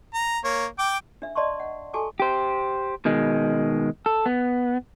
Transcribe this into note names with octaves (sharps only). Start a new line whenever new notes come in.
A#5
A#3 C#5
G5 D6
D4 E5
D5 D#5 A5 C6 C#6
F#5
F#4 A4 G#5 A5 C#6 D6
G4 C5
B2 D#3 G#3
A4
B3